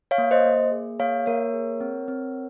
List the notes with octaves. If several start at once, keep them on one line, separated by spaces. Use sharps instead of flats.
C#5 F5
A#3
C5 D#5
A#3
G#4
A#3 C#5 F5
A#3 A#4 C#5
G#4
C4
C4